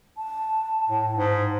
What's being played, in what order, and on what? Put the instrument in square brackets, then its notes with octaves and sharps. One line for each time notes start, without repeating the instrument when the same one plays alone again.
[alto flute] A5
[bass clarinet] A2
G#2